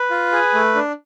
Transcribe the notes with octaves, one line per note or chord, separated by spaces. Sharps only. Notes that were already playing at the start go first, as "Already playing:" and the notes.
Already playing: B4
F4
G#4
A3
D4